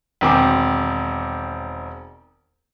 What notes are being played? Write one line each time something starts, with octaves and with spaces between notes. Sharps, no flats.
E1 D#3 C4 G#5 D6